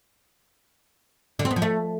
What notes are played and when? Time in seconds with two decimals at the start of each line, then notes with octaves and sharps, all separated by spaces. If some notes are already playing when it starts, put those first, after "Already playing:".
1.39 D3
1.45 C4
1.51 B3
1.56 F3
1.62 A3